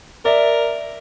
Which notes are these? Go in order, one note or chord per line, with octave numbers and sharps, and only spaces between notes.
A#4 D5 E5